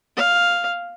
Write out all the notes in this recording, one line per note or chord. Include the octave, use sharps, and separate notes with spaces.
F5